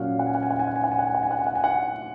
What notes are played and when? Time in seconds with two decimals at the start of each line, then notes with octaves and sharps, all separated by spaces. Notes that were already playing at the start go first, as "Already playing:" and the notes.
Already playing: A#2 F#3 C#4 F5 F#5
0.19 F#5
0.27 G#5
0.35 F#5
0.43 G#5
0.51 F#5
0.59 G#5
0.68 F#5
0.76 G#5
0.84 F#5
0.92 G#5
0.99 F#5
1.07 G#5
1.15 F#5
1.23 G#5
1.31 F#5
1.39 G#5
1.47 F#5
1.55 G#5
1.64 F#5